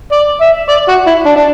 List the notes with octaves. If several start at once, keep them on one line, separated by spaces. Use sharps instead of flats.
D5
E5
D5
F#4
E4
D4
D4